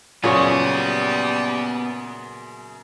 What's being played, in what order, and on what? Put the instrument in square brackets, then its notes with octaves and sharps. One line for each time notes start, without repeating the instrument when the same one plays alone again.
[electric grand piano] F#2 G#4 [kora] A#2 C#3 C#5 [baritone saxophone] G3 [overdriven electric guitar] B3